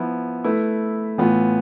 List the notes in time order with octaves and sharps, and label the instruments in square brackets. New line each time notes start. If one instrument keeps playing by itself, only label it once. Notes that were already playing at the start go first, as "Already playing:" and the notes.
Already playing: [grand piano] F3 B3 E4
A3 E4 B4
A2 E3 B3 F4